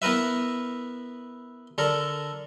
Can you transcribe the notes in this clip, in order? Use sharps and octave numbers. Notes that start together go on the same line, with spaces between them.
B3 E4 A#4 B4 E5
D3 A4 A#4